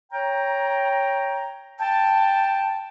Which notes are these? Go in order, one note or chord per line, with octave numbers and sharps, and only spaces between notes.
C#5 G5 A#5
G5 A5